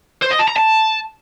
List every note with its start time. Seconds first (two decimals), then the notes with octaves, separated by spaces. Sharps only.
0.22 C5
0.31 D#5
0.39 A5
0.48 A#5
0.56 A5